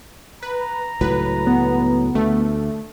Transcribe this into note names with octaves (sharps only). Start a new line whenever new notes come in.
B4 A#5
C#2 A2 F#3 B4
B3
D2 A3